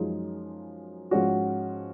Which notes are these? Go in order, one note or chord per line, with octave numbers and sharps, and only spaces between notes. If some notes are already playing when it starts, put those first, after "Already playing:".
Already playing: F#2 F3 G#3 D#4
G#2 F3 G#3 C#4 F#4